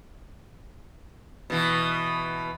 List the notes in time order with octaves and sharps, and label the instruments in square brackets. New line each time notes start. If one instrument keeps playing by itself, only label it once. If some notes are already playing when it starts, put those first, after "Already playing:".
[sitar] B2 E3